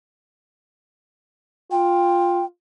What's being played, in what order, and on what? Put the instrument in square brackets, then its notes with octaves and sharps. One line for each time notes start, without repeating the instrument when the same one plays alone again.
[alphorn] F4 [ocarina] G5